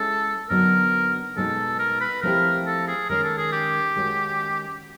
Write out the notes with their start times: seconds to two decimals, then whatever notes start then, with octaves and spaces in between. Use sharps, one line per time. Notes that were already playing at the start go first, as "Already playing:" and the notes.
Already playing: G#3 C#4 E4 G#4 A4
0.50 D3 F#3 B3 D#4 A#4
1.37 B2 G#3 B3 D#4 F#4 A4
1.79 A#4
2.01 B4
2.22 F3 A3 C4 E4 G4 A#4
2.67 A4
2.88 G#4
3.09 D#3 G#3 C#4 A#4
3.24 A4
3.38 G#4
3.52 G4
3.96 D#3 G#3 C#4 F#4